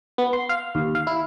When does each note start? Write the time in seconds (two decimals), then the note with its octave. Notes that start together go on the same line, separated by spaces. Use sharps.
0.18 B3
0.33 C6
0.49 F5
0.75 D#2
0.95 F5
1.07 E4